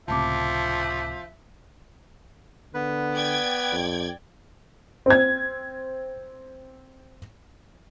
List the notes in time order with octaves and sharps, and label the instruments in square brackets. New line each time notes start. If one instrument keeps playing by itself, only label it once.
[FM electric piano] C#2 A2 C3 [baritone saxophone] F3 [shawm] E5 [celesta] A5 D6
[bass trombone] D3 [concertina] B3 B4
[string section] D5 G5 G#6
[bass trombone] F2
[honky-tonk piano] C4 G#6